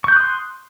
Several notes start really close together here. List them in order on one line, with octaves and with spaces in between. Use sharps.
C#6 G6 F#6 D#6 C6